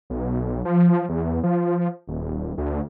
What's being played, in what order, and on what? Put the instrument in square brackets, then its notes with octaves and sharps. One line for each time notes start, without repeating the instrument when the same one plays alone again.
[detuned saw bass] B1
F3
E2
F3
D#1
D2